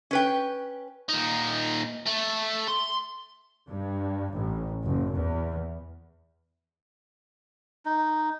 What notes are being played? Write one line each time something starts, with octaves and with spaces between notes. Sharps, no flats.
C#4 B4 G5
A#2 D#4
A3
C6
G2
A1
F#1
E2
D#4